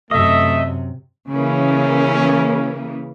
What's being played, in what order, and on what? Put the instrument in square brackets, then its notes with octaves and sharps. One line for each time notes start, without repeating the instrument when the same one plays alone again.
[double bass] F#2 C3 [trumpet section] A3 E5 [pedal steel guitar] D#5
[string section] C#3 E3 A#3 [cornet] C#4